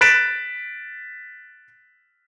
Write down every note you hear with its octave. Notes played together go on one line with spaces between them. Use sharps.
F#6 A6 B6 D7 E7